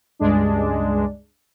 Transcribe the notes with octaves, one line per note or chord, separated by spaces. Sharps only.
C#2 G2 G#3 D4